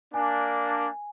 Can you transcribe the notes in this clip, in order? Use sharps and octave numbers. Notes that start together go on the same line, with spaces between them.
A#3 D4 G#5